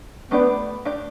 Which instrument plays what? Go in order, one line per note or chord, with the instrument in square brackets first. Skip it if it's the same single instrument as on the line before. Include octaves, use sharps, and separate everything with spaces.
[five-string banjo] A3 D4 G4 D5 [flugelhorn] B3
[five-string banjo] A3 D4 G4 D5